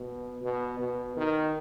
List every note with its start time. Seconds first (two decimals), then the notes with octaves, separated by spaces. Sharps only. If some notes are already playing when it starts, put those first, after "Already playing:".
Already playing: B2
0.43 B2
0.79 B2
1.17 D#3